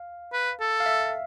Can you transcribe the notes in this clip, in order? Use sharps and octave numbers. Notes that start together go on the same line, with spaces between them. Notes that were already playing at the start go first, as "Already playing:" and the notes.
Already playing: F5
B4
A4
F5
E5